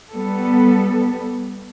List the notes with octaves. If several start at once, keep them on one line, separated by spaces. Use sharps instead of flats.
G3 B3 A4